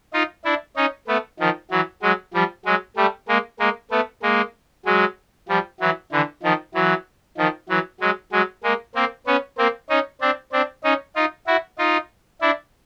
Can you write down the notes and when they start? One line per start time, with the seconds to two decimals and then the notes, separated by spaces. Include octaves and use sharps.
0.14 D#4 F4
0.45 D4 E4
0.76 C#4 D#4
1.08 A3 B3
1.39 D#3 F3
1.71 E3 F#3
2.02 F#3 G#3
2.34 F3 G3
2.65 F#3 G#3
2.97 G3 A3
3.28 G#3 A#3
3.60 G#3 A#3
3.91 A3 B3
4.23 G#3 A#3
4.85 F#3 G#3
5.49 F3 G3
5.80 E3 F#3
6.12 D3 E3
6.43 D#3 F3
6.74 E3 F#3
7.37 D#3 F3
7.69 E3 F#3
8.00 F#3 G#3
8.32 F#3 G#3
8.64 G#3 A#3
8.95 A#3 C4
9.27 B3 C#4
9.58 A#3 C4
9.90 C#4 D#4
10.21 C4 D4
10.52 C4 D4
10.84 C#4 D#4
11.16 D#4 F4
11.47 E4 F#4
11.79 D#4 F4
12.41 D4 E4